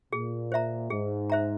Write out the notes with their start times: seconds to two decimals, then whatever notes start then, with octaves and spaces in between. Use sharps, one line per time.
0.13 A#2 G#4
0.52 C5 E5 A#5
0.90 G#2 G#4
1.30 C5 E5 A#5